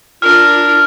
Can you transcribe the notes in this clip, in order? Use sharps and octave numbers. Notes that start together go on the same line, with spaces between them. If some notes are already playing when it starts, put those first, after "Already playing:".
D4 F4 A#4 F6